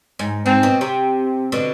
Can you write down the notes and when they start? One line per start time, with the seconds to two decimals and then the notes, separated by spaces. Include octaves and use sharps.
0.19 G#2
0.46 G#2 C4
0.63 B2
0.81 C3
1.52 B2 D3